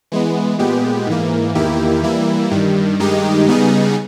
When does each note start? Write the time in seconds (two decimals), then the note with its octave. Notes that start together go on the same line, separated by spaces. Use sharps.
0.12 E3 G#3 B3
0.59 A#2 G#3 B3 G4
1.07 G#2 E3 A#3
1.55 E2 D#3 A#3 E4 G4
2.03 E3 G3 A#3 E4
2.51 G2 D#3 G3
2.99 G2 D#3 G#3 D#4 G4
3.47 C#3 G3 B3 D#4 G#4